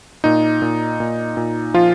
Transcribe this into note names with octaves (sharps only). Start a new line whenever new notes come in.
A#2 D#4
A#2
A#2
A#2
F3 F4